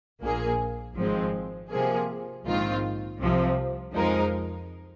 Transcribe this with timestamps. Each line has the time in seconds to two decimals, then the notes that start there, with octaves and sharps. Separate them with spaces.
0.21 A#1 A#2 A#3 G#4
0.96 G#1 G#2 F3 G#3 C4
1.70 C3 F3 A#3 G#4
2.45 A#1 G#2 D#3 C4 F4
3.20 C2 C3 F3
3.94 F2 F3 G#3 D#4 A#4